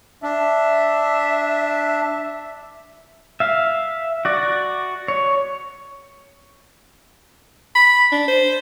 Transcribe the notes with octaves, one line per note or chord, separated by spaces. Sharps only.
D4 E5
E5 F5
F#4 D5
C#5
B5
D4
C5